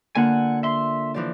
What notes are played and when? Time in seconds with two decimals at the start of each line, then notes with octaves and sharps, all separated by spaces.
0.15 D3 A#3 F4 F#5 G#5
0.63 E5 C6
1.14 E3 F3 D5